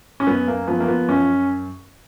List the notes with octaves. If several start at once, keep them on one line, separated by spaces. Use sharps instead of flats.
C#4
F#2 B3
A#3
F3 B3
A#3
B3
F#2 C#4